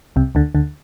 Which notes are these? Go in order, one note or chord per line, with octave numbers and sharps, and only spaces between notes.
C2 C3
D2 D3
D2 D3